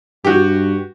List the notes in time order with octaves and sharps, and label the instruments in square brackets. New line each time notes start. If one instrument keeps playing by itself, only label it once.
[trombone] G2 [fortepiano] F#4 G4